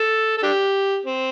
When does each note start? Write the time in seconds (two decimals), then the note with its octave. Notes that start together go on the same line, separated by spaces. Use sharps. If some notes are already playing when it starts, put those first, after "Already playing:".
Already playing: A4
0.37 A4
0.43 D4 G4
1.05 C4